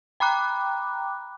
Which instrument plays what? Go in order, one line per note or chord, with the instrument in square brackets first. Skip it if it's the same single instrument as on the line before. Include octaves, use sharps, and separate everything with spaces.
[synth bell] G5 A#5 B5 D6 F#6